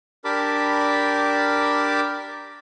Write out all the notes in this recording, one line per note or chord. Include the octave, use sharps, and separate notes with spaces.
D4 G4 A#4 A5 B5 D6